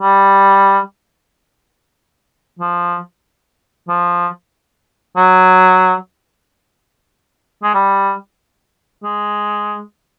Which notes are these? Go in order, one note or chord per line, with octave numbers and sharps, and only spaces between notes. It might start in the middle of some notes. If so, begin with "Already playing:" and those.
G3
F3
F3
F#3
G#3
G3
G#3